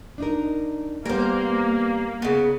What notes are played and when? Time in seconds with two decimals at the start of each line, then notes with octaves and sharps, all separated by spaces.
0.18 D4 D#4 A#4
1.05 G3 A#3 B3 A#4 C5
2.22 C#3 B3